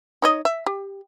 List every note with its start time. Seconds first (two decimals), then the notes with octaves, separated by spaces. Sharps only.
0.22 D#4 C#5 D#5
0.45 E5
0.66 G4